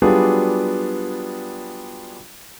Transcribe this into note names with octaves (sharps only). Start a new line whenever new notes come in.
F#3 G3 B3 D4 F4 G#4